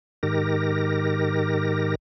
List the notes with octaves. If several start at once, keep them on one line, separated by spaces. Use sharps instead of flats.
G#2 D#3 G4 A#4 A#6